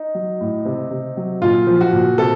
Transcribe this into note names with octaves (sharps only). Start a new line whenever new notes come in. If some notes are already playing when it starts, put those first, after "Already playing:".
Already playing: D#4
F#3
A2
C3
C3
F#3
A#2 F4
F3
F#4
A#2
C3 A4